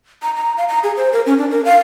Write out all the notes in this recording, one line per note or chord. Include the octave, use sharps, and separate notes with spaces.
A#5
A#5
F5
A#5
G#4
C5
A#4
C#4
D4
A#4
F5